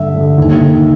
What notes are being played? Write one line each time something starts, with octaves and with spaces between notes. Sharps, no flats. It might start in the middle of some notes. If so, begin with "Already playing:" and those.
Already playing: G2 D3 E5
D3
D#2
D#2